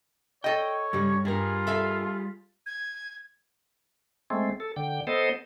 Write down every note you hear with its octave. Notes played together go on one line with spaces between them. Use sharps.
A4 C#5 D#5 G5
G2 C#3 G3
G2 G3 F4 G#4 A#4
A4 E5 F5
G#6
G#3 A3 C4
A4
D3 G5
B3 A4 C5 D#5